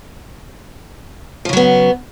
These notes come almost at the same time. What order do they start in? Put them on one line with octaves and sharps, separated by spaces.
F3 C#3 F#3 B3